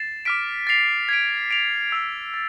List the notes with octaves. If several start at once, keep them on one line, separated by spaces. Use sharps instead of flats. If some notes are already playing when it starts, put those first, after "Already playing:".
Already playing: A6 C7 E7
D6 F6 B6 D7
A6 C7 F7
G#6 B6 D7
A6 D7 F7
E6 G#6 D7 F7
A6